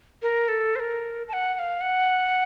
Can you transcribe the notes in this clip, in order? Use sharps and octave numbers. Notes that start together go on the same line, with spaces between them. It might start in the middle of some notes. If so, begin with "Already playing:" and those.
A#4
A4
C5
A#4
A5
F#5
F#5
F5
F#5